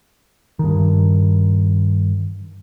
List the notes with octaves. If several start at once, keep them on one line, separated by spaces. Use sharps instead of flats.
G2 D#3